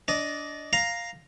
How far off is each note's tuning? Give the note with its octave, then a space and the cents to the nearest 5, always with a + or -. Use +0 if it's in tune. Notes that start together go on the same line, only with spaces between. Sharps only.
D4 -15 D#5 +0
F5 +0 A#5 +0